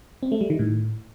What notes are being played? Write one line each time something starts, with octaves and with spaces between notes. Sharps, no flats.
C4
A3
G3
D#3
A2